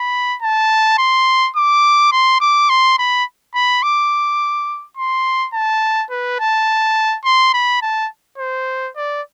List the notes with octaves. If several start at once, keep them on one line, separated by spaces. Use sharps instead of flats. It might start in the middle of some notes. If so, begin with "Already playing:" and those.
Already playing: B5
A5
C6
D6
C6
D6
C6
B5
B5
D6
C6
A5
B4
A5
C6
B5
A5
C5
D5